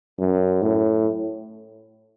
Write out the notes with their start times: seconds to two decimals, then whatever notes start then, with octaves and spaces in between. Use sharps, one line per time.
0.19 F#2
0.62 A2